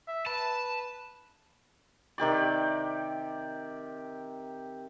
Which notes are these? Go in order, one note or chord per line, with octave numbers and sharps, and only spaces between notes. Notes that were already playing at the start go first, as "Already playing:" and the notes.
E5
B4 A5
C3 D#3 G4 D5